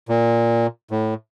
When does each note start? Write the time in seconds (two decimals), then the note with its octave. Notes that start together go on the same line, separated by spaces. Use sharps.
0.09 A#2
0.91 A2